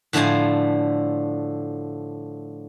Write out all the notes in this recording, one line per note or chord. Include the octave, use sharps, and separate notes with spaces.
A2 D3 F3 A3 C5 G#5